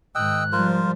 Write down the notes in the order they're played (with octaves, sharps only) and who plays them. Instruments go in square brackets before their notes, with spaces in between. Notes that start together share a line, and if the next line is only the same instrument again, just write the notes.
[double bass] G#2 D#3 [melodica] D#5 G5 E6 [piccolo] F#6
[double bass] F3 [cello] G3 [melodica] F4 A#4 C5